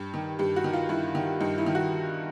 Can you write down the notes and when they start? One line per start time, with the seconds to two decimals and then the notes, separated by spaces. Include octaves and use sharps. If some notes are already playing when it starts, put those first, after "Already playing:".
Already playing: G2 G4
0.14 D#3
0.39 G2 G4
0.56 F#4
0.64 D#3
0.73 F4
0.89 G2 E4
1.15 D#3
1.40 G2 D#4
1.58 E4
1.66 D#3
1.75 F#4